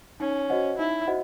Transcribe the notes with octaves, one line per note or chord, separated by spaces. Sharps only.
C#4 D#4
F#4 C5 D#5 F#5
D#4 E4
F#4 C5 D#5 F#5